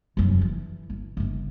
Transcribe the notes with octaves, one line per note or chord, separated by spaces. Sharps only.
F1 F#2
D3 E3
G1
G1 C#3